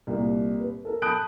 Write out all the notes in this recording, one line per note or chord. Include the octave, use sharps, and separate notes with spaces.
C2 A#2 A#3
B4
A4 A#4
A5 B5 D#6 F#6 G6 D7